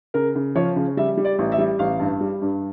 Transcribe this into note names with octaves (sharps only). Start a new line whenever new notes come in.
C#3 A#4
C#3
F3 C#5
C#3
G3 E5
G3
D5
A1
E5
G3
A1 F5
G2
G3
G2